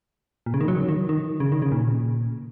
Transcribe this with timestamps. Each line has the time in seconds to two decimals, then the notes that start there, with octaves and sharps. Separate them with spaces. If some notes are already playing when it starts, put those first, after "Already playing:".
0.46 A#2
0.54 C#3
0.61 D#3
0.68 F#3
0.88 D#3
1.09 D#3
1.40 C#3
1.52 D#3
1.62 C#3
1.72 A#2